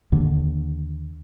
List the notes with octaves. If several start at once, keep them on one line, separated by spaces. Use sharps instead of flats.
D#2 D3